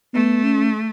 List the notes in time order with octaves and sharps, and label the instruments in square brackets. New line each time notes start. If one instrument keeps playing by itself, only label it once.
[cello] A3 [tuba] B3
[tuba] C#4